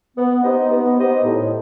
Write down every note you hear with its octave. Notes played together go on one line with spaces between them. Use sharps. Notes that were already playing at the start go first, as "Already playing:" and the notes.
B3
D#4 G4 C5 D#5
B3
D#4 G4 C5 D#5
A2